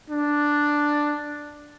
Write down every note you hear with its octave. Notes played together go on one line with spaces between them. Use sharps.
D4